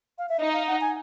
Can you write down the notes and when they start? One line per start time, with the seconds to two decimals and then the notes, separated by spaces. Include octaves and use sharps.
0.18 F5
0.29 E5
0.40 D#4 D#5
0.53 F5
0.67 F#5
0.81 G#5